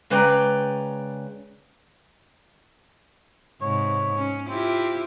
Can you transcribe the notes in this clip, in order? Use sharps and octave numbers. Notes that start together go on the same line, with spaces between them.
C#3 G#3 B4 D5 G5 A#5
G#2 C3 C#5
C#4
C4 E4 F4 G4